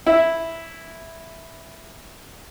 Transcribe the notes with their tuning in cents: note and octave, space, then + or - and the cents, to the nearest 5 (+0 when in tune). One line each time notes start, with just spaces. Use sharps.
E4 -5